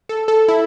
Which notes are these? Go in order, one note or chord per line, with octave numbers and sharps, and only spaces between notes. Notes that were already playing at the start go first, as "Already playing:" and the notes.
A4
A4
E4